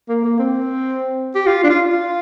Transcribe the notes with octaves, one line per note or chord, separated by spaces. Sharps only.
A#3
A#3
C4
G4
F4
D4
F4
F4